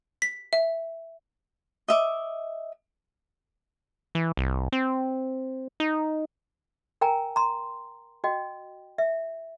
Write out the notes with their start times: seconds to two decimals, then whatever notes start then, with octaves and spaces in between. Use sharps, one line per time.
0.22 B6
0.53 E5
1.88 D#5 E5 D6
4.15 E3
4.37 C2
4.72 C4
5.80 D#4
7.01 A#4 G5 G#5 A#5
7.36 A#5 C6
8.24 F#4 D#5 G5
8.98 E5